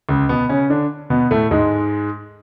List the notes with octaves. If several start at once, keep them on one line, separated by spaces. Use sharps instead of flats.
C#2 C#3
B2 B3
C#3 C#4
D3 D4
B2 B3
A2 A3
G#2 G#3